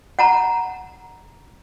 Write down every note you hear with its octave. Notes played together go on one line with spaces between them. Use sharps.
F#5 A5 A#5